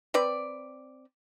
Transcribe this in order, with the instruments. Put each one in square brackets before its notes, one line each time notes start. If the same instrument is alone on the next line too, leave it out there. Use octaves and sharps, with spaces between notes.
[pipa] C4 B4 D5